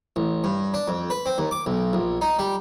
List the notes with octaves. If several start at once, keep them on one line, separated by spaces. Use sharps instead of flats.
A1
G2
D4
F2
B4
C4
D#2
D6
B1
A#1
D#4
G3